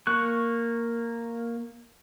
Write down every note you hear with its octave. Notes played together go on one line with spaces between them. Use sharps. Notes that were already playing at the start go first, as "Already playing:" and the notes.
A#3 C#6 F#6